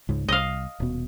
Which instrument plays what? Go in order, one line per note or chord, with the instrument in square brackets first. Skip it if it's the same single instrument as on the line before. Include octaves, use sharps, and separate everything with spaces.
[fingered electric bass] C#2 G#2
[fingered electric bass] C2 [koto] D#5 F5
[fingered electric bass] D#1 B2